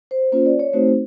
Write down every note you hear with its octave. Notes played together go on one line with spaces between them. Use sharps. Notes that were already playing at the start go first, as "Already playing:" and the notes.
C5
A#3 C#4 F4 C5
D5
C#5
A3 C4 D#4 F#4 C5